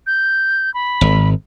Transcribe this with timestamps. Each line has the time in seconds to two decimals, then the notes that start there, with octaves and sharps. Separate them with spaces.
0.07 G6
0.74 B5
1.01 G#1